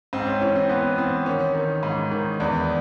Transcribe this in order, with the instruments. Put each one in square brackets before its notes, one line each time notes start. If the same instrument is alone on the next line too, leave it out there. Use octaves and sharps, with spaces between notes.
[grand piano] G#2 C4
C#4
E3 C#4
C4
E3 B3
E3 C4
D#3 C#4
D#3
G#2
D#3
E2 D4